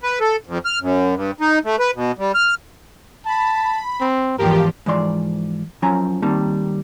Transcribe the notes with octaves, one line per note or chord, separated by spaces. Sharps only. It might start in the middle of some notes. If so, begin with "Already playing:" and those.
B4
A4
F2
F6
F#2
G2
D#4
A3
B4
B2
G3
F6
A5 B5
C4
E2 G#2 F3 G4 A#4
G#2 E3 F3 D5 C6
F#2 F3 F#3 C#4 G#5 A#5
D#3 G3 A#3 C4 D#4 A5